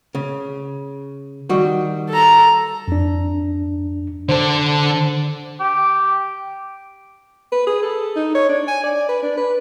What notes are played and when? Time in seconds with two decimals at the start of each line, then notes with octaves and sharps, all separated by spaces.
0.15 C#3
1.49 D#3 G3 F#4
2.10 A4 A#5
2.88 F2 D4
4.29 D3 A4 C5
5.60 G4
7.52 B4
7.67 G#4
7.83 A4
8.16 D#4
8.35 C#5
8.49 D4
8.68 G#5
8.84 D5
9.09 B4
9.23 D4
9.37 B4